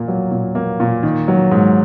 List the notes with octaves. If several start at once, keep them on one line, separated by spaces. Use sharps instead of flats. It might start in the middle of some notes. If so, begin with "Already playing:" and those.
Already playing: A#2 A#3
F#3
A#2
A#3
A#2
D#3
F#3
G#2